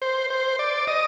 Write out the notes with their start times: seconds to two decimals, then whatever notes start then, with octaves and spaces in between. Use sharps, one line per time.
0.02 C5
0.30 C5
0.59 D5
0.87 D#5